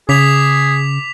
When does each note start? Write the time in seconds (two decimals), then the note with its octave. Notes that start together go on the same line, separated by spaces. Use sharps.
0.09 C#3 G#4 D6 B6 F7